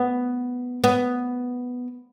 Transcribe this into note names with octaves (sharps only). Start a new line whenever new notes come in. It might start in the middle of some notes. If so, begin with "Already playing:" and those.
Already playing: B3
B3